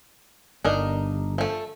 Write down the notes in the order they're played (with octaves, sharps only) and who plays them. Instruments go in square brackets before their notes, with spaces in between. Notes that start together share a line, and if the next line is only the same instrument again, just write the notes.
[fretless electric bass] G1 [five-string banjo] D4 D#4 A#4
[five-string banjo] F3 A3